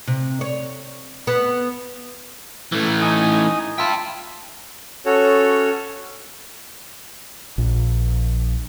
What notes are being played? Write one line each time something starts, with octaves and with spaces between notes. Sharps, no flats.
C3
C#5
B3
E3 A3
D#4 G#5 D#6
F4 E5 G5 A5
C#4 F#4 A4 C#5
A#1